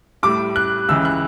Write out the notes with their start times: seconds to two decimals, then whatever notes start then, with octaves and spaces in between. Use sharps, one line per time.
0.23 A2 G3 D6
0.56 F#6
0.88 C#2 C#3 E3 E6
1.05 F#6